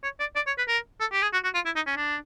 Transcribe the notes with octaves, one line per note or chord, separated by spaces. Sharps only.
C#5
D5
D5
C#5
B4
A#4
A4
G4
G#4
F#4
F#4
F4
E4
D#4
C#4
D4